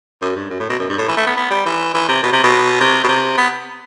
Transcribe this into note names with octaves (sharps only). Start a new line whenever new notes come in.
F#2
G2
F#2
A2
B2
F#2
G2
A2
E3
A3
B3
B3
G3
E3
E3
C3
B2
C3
B2
C3
B2
C3
B3